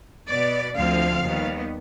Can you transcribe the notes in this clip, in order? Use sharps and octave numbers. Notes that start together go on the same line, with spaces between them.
B2 B3 D5
D2 D3 F3 C4 F5
D#2 D#3 G3 B3